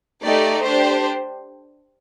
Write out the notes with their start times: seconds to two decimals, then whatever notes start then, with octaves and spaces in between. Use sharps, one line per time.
0.22 A3 D#4 G4 D5
0.63 D4 G4 C5